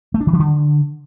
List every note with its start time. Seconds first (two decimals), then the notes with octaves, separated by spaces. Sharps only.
0.14 A3
0.20 D4
0.27 D#3
0.33 E3
0.39 D3